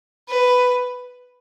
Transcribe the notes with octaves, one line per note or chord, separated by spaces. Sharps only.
B4